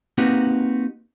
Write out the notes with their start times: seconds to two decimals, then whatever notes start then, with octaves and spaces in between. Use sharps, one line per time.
0.18 A#3 C4 D#4 F#4 G4 B4